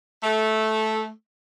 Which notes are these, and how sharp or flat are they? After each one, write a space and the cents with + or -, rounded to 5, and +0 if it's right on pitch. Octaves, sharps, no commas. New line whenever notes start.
A3 -10